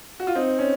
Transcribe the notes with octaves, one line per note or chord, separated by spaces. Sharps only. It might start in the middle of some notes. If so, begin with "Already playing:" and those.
F#4
F4
C4 D#4
C#4